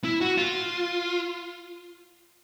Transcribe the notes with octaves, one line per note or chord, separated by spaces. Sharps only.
E4
F#4
F4